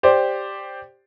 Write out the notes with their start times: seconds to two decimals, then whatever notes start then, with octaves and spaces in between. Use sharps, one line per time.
0.03 G4 C5 D5